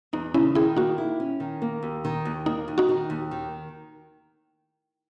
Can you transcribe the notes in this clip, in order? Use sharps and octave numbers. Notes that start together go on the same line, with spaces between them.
E2 D#4
C#3 C#4 E4
D#3 E4 G#4
A#3 D#4 F#4
E4
C#4
D#3
A#3
D#2
D#3
D#2
A#3 D#4
D#2
D#4 F#4
D#3
D#2
D#3